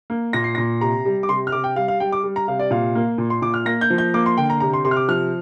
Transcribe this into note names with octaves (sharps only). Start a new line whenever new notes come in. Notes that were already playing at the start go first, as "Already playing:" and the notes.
A#3
A#2 A#6
C7
A#2 A#6
C3 A#5
G3
D6
C3 C6
F6
C3 D6
G5
G3 F5
F5
G3 G5
D6
G3
A#5
C3 F5
D5
A#2 F5
A#3
A#2
C6
A#2 D6
F6
A#3 A#6
G6
F3
G6
A#3 D6
C6
D3 G5
A#5
C3 A#5
C6
C3 C6
F6
D6
F3 F6